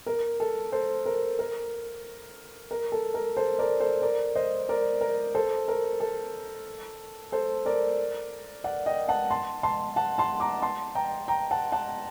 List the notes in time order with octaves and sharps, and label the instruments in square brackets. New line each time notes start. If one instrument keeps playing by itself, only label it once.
[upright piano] A#4
A4
A4 C5
A#4
A#4
A#4
A4
A#4
A4 C5
A#4 D5
A4 C5
A#4 D5
C5 D#5
A#4 D5
A#4
A4 C5
A#4
A4
A4 C5
A#4 D5
D5 F#5
D#5 G5
F#5 A5
A5 C6
A5 C6
F#5 A5
A5 C6
A#5 D6
A5 C6
G5 A#5
G5 A#5
F#5 A5
F#5 A5